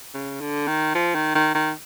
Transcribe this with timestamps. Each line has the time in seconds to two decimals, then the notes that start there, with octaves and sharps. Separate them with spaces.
0.14 C#3
0.41 D3
0.68 D#3
0.95 F3
1.15 D#3
1.35 D#3
1.55 D#3